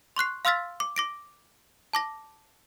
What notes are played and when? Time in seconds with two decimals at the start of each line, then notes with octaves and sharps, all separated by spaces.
0.16 C6 C#6 F#6 C7
0.45 F5 C6 E6 F6 A6 B6
0.80 D6
0.96 D6 A#6 D7
1.93 A5 D6 A#6